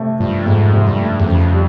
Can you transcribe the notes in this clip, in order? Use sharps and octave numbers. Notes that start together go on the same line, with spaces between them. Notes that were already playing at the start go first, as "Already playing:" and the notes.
Already playing: C3 A3
G2 F3
F2 G#2
C3
G2
A3
E2
F2 C#3
G3